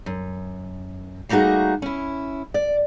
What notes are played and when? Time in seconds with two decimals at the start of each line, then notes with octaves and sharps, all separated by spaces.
0.06 F#2
1.29 G3 A3 A#3 D#4 F#4 G#4
1.82 C#4 E4
2.54 D5